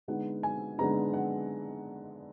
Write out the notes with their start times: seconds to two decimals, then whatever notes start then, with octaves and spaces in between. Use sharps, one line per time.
0.08 D3 G#3 B3 D#4 F#5
0.43 G#5
0.78 D3 G#3 B3 D#4 A#5
1.14 F#5